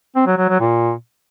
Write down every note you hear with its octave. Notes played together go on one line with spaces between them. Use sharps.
C4
F#3
F#3
F#3
A#2